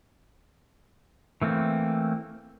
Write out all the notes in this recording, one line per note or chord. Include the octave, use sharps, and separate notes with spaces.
E3 A3 A#3 C4